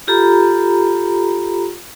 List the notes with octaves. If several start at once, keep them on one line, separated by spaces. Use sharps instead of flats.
F4 G4 A4 A#5 B5